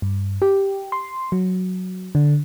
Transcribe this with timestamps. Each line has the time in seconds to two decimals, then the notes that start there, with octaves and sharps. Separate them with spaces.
0.02 G2
0.42 G4
0.92 C6
1.32 F#3
2.15 D3